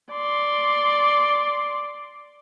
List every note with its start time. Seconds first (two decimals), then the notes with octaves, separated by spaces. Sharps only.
0.12 D5 C6